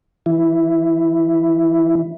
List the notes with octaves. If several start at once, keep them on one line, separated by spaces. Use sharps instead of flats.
E3 E4